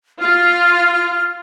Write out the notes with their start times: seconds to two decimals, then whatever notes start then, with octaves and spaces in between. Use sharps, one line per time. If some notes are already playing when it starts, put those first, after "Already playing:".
0.21 F4 F6